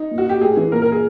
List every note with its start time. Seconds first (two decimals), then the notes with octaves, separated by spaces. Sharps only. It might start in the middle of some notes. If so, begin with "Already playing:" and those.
Already playing: D#4
0.11 A#2
0.18 F#4
0.29 G4
0.41 A2 G#4
0.57 E3
0.72 A#2 A#4
0.82 A#4
0.92 G#4